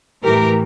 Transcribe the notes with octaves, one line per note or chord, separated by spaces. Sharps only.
A2 E3 A3 G4 A#4